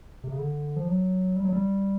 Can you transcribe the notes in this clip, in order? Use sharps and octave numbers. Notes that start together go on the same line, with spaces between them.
C3
C#3
D3
F3
F#3
G3
F#3
G3